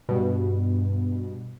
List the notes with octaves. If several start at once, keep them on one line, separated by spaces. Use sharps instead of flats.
G2 B2